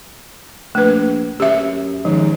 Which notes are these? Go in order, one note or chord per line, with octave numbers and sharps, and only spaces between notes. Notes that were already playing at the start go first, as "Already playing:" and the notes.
A#1 A3 B4
F#2 G4 E5
G#2 D#3 F3